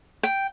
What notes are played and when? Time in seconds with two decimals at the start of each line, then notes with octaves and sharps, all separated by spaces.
0.23 G5